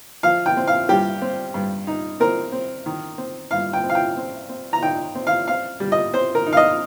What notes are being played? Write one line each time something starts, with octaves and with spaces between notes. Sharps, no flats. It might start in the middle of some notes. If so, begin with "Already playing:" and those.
F3 F5
G5
C4
F5
G2 G4
C4
G2
D#4
C4 A#4
C4
D#3
C4
G2 F5
G5
C4
F5
G5
C4
C4
A#5
D#4 G5
C4
F5
C4 F5
G3
D#5
C4 C5
A#4
D#4
F5
D#5